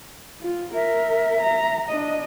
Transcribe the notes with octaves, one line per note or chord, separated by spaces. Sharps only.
F4
A#4 E5
A#5
D4 D#5